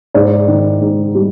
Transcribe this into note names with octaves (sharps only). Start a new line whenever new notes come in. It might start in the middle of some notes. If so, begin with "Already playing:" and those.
G#2 D5
D#3
G#2
G3